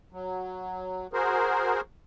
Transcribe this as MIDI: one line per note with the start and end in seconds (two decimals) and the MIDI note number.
0.12 1.07 54
1.13 1.81 66
1.13 1.81 68
1.13 1.81 70
1.13 1.81 72